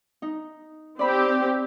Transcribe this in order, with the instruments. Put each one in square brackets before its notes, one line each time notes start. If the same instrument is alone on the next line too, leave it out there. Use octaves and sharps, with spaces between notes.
[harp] D#4
[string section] C4 G4 [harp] D5 B5